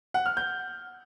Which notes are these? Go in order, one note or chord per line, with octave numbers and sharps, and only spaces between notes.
F#5
F6
G6